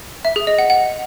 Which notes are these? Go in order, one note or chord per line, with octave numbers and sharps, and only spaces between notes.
E5
G#4
D#5
F#5
F#5